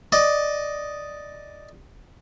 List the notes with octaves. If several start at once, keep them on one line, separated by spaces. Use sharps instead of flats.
D5 D#5